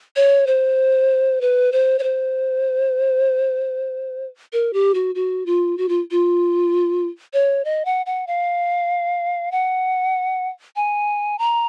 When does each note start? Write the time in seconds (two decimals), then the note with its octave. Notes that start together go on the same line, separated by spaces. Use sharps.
0.16 C#5
0.47 C5
1.41 B4
1.72 C5
1.99 C#5
2.03 C5
4.53 A#4
4.73 G4
4.94 F#4
5.15 F#4
5.46 F4
5.78 F#4
5.89 F4
6.11 F4
7.33 C#5
7.65 D#5
7.85 F#5
8.06 F#5
8.27 F5
9.52 F#5
10.76 G#5
11.39 A#5